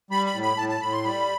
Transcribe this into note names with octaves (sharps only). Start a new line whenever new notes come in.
G3 B5
B5
A2
B5
A2 A5
A5
A2 B5
C6
G3 B5